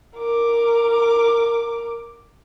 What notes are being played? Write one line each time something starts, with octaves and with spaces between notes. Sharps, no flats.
A#4 D6